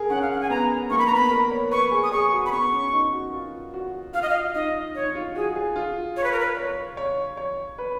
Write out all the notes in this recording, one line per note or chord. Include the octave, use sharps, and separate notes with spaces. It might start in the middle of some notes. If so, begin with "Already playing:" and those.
Already playing: G#4 A#4
C#4 F#5
F5
F#5
G#5
B3 A#5
A#3 C#6
B5
A#5
B3
B5
A#4
C#5
B4 C#6
G#4
D#6
G#4 C#6
F#4
B5
B3 C#6
C#4
D#4
F#4
F4
F#4
F4 F5
D#5
F5
D#4 D#5
D#4 C#5
F4
F#4 G#4
G#4
F4
C#5
B4
A#4
B4
C#5
C#5
C#5
B4